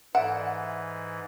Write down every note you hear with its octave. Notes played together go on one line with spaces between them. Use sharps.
G#2 E3 A4 D5 E5 F#5